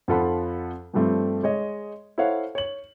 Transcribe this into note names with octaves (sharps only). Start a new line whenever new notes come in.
F2 F3 F4 A4 F#5 B5
G2 F3 G3 A3 C4
G#3 C#5 D#5
E4 A4 C5 C#5 F5 F#5
C#5 F#7